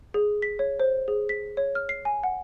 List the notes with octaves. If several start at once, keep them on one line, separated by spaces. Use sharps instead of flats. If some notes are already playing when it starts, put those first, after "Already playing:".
G#4
B6
C#5
C5
G#4
B6
C#5
F6
C7
G#5
F#5